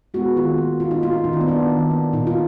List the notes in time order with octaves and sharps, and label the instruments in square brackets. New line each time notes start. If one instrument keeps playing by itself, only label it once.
[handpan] G#3 B3 F#4
D#3 F4
A#3
D#3 F4
D#4
A#3 F4
D#4
D#3 D#4
D4
B3
A#3 D4
D#3
A#3
A#2 D#4
F4